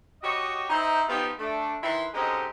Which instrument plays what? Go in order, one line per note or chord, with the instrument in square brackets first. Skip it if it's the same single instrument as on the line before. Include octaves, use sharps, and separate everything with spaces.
[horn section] F#4 G4 C#5 D#5
D#4 E4 C5
F3 B3 D#4 F4 G4
A3 D4
D#3 E4 B4 C6
D3 G#3 C4 C#4 D#4 G4